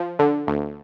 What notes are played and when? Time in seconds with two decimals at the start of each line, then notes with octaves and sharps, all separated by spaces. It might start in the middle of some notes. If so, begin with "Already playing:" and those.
Already playing: F3
0.19 D3
0.47 D2